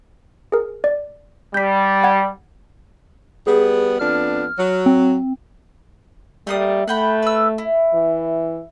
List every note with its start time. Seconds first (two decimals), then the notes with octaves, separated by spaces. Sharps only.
0.52 G#4 A#4
0.84 D5
1.54 G3 G6 B6
2.04 F#5 G#6 A6
3.47 G3 B3 G#4
3.99 F2 B3 D4 F6
4.59 F#3
4.86 C4
6.47 G3 A3 A#3 D#6
6.88 A3 F#5 G5 B5
7.22 B4 E6
7.58 E4
7.93 E3